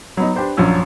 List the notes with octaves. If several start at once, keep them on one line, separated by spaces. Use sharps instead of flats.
F#3 B3 D#4
D4 G4 B4 C5 D5
A#1 F#2 F3 F#3 C#4 E6